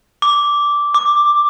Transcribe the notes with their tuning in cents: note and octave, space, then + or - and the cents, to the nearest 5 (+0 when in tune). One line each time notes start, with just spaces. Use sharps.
D6 -10
D6 +5